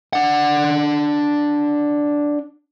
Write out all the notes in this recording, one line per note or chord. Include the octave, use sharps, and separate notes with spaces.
D4 F#5